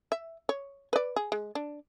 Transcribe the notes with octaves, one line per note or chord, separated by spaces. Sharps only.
E5
C#5
B4 D5
G#4
G#3
D4